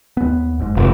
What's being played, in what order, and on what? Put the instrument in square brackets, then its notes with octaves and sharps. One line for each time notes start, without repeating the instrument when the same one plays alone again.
[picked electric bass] D#2 B3
F#1 G#2
[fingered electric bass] F1